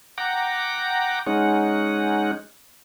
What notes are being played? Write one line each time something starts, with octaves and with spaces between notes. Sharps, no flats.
F#5 G5 A#5 D6
G#3 C#4 D#4 F#5